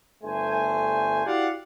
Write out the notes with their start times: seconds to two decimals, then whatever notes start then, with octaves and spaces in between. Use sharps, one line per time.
0.24 G1 G2 A3 C5 G#5
1.26 E4 F#4 G4 D5 F5 F#5